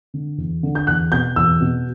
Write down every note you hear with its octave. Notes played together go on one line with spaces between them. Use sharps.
D3
E2
D3
G6
E2 F#6
B2 G6
E2 E6
B2